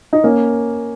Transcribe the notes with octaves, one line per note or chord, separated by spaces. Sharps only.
D#4
A#3 C#4